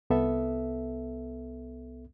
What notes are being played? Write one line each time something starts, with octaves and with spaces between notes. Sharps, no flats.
C2 B3 A4 E5